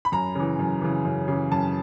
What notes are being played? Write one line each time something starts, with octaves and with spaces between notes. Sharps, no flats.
B5
F#2 A#5
C#3 E3
F#2
C#3 E3
F#2
C#3 E3
F#2 A5